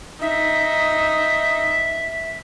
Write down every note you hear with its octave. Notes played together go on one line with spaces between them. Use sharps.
D#4 E5